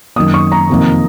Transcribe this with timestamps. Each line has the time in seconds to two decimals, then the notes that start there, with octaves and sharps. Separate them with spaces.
0.16 F#2 D#3 A#3 D#6
0.34 C#6
0.52 A#5
0.69 F2 C3 D#3 A#3